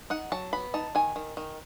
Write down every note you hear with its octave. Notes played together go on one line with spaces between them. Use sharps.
D#4 F#5
F#3 A5
B3 B5
D#4 A5
D#3 G#5
D#3
D#3